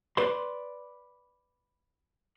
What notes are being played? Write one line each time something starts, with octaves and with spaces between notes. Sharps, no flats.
B4 D5 C6